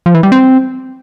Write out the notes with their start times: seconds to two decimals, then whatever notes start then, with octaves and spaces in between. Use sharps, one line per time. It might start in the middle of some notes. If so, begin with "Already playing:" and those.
0.06 F3
0.15 E3
0.23 G3
0.32 C4